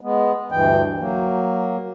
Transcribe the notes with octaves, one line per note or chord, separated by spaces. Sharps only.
G#3 B3
D2 G2 E3 G5
F#3 A#3